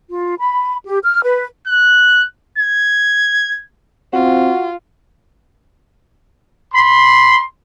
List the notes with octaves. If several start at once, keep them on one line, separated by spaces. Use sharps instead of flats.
F4
B5
G4
F6
B4
F#6
G#6
C4 F4 F#4
B5 C6